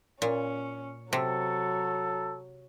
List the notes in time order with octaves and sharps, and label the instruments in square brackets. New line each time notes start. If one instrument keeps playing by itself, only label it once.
[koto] A#2 [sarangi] C#4
[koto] C3 [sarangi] F#3 [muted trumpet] A4